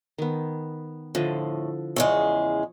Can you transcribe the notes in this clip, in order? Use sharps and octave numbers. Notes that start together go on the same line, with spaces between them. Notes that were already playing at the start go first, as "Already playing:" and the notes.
D#3 B3
A2 D3 F3 D#5
E2 C#3 G#3 C#5